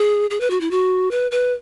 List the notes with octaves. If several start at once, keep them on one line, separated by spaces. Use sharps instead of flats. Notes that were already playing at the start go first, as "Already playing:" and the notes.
Already playing: G#4
G#4
B4
F#4
E4
F#4
B4
B4